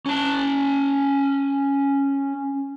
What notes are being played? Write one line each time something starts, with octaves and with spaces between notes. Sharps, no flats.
C#4 A5